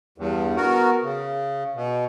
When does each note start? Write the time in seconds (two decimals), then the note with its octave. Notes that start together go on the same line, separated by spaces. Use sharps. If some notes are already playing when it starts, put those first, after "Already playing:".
0.18 E2 G2
0.56 B3 F#4 A#4
1.03 C#3
1.75 B2